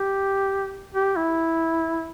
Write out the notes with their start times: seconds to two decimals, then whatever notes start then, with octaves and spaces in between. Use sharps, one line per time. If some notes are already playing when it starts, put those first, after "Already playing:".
Already playing: G4
0.95 G4
1.16 E4